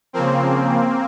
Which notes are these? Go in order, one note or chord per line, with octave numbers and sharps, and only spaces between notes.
C#3 F3 A#3 C4